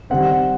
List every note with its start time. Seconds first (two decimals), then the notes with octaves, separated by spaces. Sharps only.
0.10 D#3 G3 C4 F#5